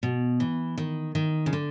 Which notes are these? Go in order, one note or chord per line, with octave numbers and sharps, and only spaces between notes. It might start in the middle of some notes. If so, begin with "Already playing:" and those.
B2
E3
D#3
D#3
C#3
D3